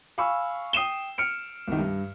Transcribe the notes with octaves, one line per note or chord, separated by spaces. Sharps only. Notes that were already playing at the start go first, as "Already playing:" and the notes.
F5 G#5 B5 C#6 E6
G5 D#6 C7 D#7 E7 G7
F6 C#7 D7
C2 D#3
G2